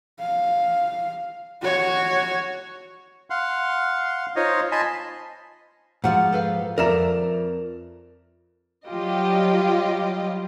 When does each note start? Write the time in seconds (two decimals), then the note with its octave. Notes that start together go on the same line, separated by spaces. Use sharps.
0.20 F5
1.62 F#4 C#5
3.30 F5 F#5 C6
4.36 D#4 F4 C5 C#5 D#5
4.72 D#5 G#5 A5 B5 C6
6.04 G#2 F3 F4 F#4 F#5
6.32 A4 B4 F5
6.78 F2 A#4 D5 E5 A#5 E7
8.86 F#3 G3 F4 G4 D#5